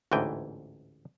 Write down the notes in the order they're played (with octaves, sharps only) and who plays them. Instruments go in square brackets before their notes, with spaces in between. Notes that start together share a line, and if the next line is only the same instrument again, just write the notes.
[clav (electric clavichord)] A1 D2 G#2 E3 G5 G#5